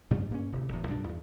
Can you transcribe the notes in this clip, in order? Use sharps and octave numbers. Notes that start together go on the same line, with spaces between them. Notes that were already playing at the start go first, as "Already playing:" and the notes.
G2 C#3 G3 A3
G2 A#3 C#4
D1 C3
F#1 E2 A2
B1 G2 A#2 D4
E2